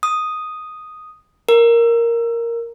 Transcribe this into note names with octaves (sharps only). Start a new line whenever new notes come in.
D#6
A#4